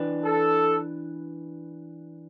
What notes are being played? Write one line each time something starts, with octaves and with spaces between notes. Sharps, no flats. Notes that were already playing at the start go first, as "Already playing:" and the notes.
Already playing: E3 D4 B4
A4